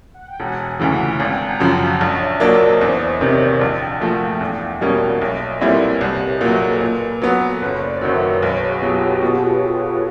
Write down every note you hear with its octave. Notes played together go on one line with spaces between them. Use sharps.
F#5
G5
E1 F#5 G#5
D2 C#3 E3
G#1 G5 A5
G#5 A#5
G#5
F#2 C#3 F3 G5 A5
G5 A5
A#1 C#5 D#5
D5 E5
A#2 F#3 A#3 D4 C#5 D#5
C5 D5
D5
E2 B4 C#5
D5
B4 C#5
C3 D#3 C#5 D#5
D#5 F5
A#1 G5
F#5
F5
A#2 F3 A3 E5 F#5
E2
B2 G3 A#3 C#4
D5
D#5
B1 D5 E5
C#5 D#5
A#4
A#2 G3 C4 E4 A4 B4
A#4
C2 G4 A4
G#4 A#4
A#2 F#3 A4 B4
A4 B4
A#2
F#3 B3
F#1 B4 C#5
C5 D5
F#2 D#3 F#3 D5 E5
C#5 D#5
B1 B4 C#5
F#4 G#4
B2 F#3 F4 G4
G4 A4
B2